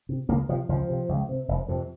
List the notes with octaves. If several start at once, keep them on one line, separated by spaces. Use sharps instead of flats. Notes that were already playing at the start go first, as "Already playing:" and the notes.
C3
C#2 A#3
C3 F3
C#2 F3
C3
C#2
C3
F1
F2 C3